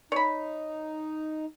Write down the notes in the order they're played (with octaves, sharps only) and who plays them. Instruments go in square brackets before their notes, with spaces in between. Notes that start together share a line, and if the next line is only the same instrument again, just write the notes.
[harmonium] D#4 [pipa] C#5 B5